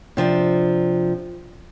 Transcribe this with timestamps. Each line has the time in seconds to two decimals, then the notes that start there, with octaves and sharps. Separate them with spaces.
0.17 C3 F3 D4